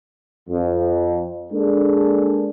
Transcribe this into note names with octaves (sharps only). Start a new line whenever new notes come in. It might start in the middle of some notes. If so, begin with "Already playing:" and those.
F2
G#3 A#3 D4 G#4 A4